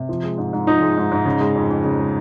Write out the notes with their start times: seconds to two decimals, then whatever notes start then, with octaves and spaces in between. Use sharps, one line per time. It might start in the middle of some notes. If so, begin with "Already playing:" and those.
Already playing: C3
0.09 F3
0.24 G#3
0.38 G#2
0.53 G#2
0.67 F3 D#4
0.81 G#3
0.97 G#2
1.11 G#2
1.25 C#3
1.40 G#3
1.55 F2
1.70 F2
1.84 C#3
1.99 G#3